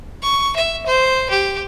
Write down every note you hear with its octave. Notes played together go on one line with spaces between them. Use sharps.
C#6
E5
C5
G4